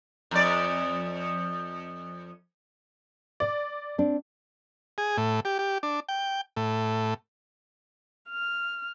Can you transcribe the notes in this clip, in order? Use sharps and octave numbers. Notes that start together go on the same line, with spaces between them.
F2 D5
D5
C4 D4
G#4
A2
G4
G4
D4
G5
A2
F6